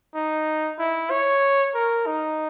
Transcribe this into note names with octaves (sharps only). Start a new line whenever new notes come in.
D#4
E4
C#5
A#4
D#4